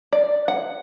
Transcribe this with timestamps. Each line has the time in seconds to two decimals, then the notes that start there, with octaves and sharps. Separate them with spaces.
0.13 D5
0.48 F#5